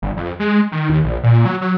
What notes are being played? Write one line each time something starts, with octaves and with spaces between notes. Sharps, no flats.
G1
F2
G#3
D#3
D#2
A#1
A#2
F#3
F#3